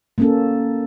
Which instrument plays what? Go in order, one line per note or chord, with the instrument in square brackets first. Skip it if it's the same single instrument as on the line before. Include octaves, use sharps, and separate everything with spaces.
[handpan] A#3 C#4 A4